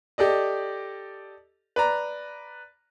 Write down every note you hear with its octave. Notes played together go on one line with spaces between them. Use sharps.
G4 A4 D5 D#5
B4 D5 A#5